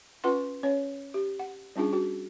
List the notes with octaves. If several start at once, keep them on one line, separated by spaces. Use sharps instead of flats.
C#4 F4 B4 F#5 C6
C#4 C#5
G4
F#5
G3 C#4 D4 F4 G#4
F#4